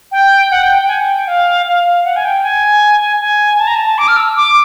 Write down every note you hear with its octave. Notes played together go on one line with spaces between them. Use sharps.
G5
F#5
G5
G5
G#5
G5
F5
F5
F#5
G#5
G5
G#5
G#5
A5
A#5
A5
D6
F6
E6
D6